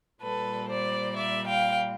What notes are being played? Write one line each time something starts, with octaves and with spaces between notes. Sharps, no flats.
A#2 G3 A4 B4
C5 D5
D5 E5
F5 G5